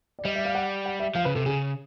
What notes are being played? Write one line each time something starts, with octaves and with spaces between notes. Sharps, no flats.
D5
G3 D#5
E5
F5
F#5
F#5
E5
F3 F5
C#3 B4
C3 A4
C#3 G#4